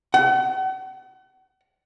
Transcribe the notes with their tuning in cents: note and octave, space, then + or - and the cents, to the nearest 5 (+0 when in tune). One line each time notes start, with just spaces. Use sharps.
F#5 +45